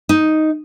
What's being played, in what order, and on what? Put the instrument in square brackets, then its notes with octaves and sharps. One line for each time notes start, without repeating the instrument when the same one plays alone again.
[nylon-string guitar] D#4